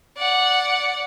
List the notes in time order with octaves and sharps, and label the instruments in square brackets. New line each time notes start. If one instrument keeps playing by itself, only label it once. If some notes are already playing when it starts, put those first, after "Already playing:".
[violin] D5 F#5